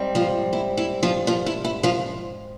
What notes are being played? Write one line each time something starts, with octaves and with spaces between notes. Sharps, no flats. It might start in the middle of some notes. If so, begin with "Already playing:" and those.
Already playing: G#2 G3 C4
F3 F4
E4
E4
F3 F4
F3 F4
E4
E4
F3 F4